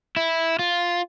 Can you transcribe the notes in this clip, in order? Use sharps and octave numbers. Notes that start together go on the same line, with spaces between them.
E4
F4